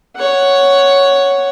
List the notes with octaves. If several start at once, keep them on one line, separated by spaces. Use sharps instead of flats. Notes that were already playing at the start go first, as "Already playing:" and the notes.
C#5 F#5